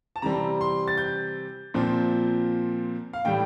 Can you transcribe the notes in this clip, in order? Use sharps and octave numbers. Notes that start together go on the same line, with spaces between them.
A5
C3 E3 G3 C4 A#5
C6
A6
G6
A#2 F3 C4
F5
A2 E3 G3 G5